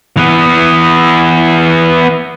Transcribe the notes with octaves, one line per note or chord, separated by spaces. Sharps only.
E3 B3